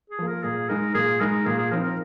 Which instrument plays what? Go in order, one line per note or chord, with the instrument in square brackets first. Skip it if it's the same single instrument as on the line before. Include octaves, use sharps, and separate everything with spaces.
[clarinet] G#4
[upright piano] F3 A#3
[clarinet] A#4
[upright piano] A#2 [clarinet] G#4
[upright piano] G#3 D#4 [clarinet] A#4
[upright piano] A#2 [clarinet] G#4
[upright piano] G#3 D#4 [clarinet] A#4
[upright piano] A#2 [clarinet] G#4
[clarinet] G#4
[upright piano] F3 C4 D#4 [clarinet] A#4
[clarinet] A#4